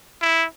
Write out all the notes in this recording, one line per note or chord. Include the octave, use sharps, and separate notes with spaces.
E4